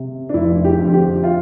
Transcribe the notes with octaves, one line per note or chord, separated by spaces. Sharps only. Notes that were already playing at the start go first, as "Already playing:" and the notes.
Already playing: C3
D4
F1 E4
G4
F2 D3 F3
G4
F4